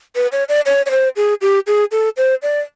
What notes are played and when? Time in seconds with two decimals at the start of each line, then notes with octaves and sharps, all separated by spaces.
0.15 B4
0.32 C#5
0.49 D5
0.66 C#5
0.86 C#5
0.91 C5
1.16 G#4
1.42 G4
1.67 G#4
1.92 A4
2.17 C5
2.42 D5